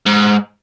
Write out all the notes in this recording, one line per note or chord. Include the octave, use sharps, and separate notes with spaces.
G#2